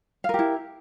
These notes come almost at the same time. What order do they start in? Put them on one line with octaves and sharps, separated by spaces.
F5 A#4 G4 E4